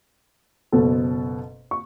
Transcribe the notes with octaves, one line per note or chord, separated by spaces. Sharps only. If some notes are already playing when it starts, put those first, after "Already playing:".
F#1 B2 A4
C#6